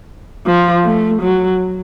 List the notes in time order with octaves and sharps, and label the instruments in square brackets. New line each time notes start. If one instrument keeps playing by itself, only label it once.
[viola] F3
A3
F#3